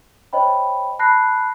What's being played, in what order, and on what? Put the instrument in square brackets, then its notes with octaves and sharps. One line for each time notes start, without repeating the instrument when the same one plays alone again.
[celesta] C5 C#5 D#5 G5 B5
A5 B5 F#6 A#6 C7